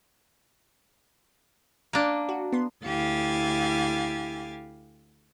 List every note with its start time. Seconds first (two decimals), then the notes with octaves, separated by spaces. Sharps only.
1.93 A#3 D4
2.29 F#4
2.52 B3 C6
2.85 D2 E4 G4 F5 G#5 A6